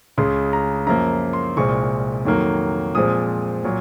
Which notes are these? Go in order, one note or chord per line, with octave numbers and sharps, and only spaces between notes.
C#2 C#3 G#3 C6
A#5
F#2 F3 A#3 A#5
C6
C2 A#2 G#3 C4 C#6
F2 D#3 F#3 A#3
A#2 F3 G#3 C4 D#6
A#2 F#3